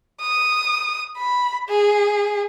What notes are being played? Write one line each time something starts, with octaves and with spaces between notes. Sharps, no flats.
D#6
B5
G#4